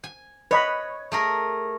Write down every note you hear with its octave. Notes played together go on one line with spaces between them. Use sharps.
G#5
B4 C#5 D#5 B5
A3 G#4 A#4